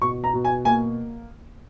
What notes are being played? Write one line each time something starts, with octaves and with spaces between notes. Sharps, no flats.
B2 C#6
A#5
B2
G#5
A#3 G#5